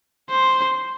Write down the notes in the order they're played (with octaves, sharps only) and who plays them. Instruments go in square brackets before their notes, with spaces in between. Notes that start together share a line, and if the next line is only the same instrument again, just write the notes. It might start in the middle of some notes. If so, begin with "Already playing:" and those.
[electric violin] C5